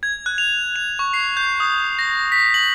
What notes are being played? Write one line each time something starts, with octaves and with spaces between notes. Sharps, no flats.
G#6
F#6
F7
F7
C#6
C7
G6
D#6
A#6
B6
F#7